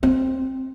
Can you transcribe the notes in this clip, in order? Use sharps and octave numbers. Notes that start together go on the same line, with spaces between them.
C4